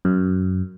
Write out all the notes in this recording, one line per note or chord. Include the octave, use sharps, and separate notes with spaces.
F#2